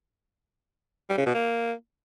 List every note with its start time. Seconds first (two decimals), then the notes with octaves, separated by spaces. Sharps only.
1.10 G3
1.18 C#3
1.26 B2
1.34 A#3